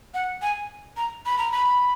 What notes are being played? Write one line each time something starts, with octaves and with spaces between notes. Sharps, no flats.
F#5
G#5
A#5
B5
A#5
B5